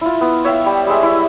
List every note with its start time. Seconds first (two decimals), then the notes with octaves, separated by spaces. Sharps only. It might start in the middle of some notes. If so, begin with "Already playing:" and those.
0.01 E4 F4
0.21 B3
0.45 C#5 E5 F5 G5
0.66 G3
0.87 G3 G#3 E5
1.03 E4